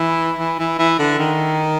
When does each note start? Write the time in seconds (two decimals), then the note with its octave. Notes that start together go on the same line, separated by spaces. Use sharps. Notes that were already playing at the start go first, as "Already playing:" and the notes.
Already playing: E3
0.39 E3
0.59 E3
0.79 E3
0.99 D3
1.19 D#3